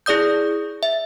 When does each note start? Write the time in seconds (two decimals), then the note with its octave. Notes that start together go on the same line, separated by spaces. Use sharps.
0.06 E4 G#4 D5 D#6 G6
0.83 E5